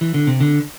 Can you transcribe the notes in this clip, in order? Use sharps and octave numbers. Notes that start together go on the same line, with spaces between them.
E3
D3
C3
D3